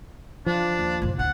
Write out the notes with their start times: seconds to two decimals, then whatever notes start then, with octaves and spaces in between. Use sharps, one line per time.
0.46 F3 D4
0.79 D#2
1.02 F#1 A#2
1.19 D2 A2 F#5